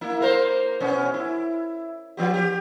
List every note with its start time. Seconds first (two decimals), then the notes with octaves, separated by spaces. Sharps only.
0.01 A#3 E4
0.20 A#3 A#4 C5
0.80 B2 B3 C#4
1.14 E4
2.17 F3 B3 G4
2.34 G4